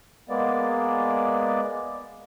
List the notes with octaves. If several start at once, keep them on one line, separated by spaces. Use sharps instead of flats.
G#3 A#3 B3 D5